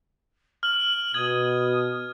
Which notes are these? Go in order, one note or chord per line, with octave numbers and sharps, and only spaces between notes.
F6 F#7
B2 D#6 G#6